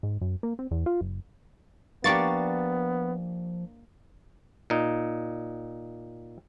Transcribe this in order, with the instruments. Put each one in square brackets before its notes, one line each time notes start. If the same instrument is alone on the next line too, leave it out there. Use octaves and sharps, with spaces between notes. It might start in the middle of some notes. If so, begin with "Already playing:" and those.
[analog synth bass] G#2
F#2
A#3
C4
E2
F4
F#1
[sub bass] F3 [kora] A#3 D4 G4 [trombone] B3 [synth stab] D5 C#6 A6
[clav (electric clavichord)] A#2 D#4